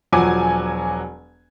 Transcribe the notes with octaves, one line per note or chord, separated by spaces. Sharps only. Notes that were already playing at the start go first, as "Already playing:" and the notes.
E1 F3 F#3 F#4 G#5 D6